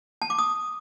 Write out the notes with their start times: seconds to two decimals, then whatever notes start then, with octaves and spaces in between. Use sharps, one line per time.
0.22 A5
0.30 D6
0.39 D#6